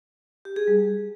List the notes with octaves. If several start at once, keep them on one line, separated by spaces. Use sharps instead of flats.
G4
G#4
G3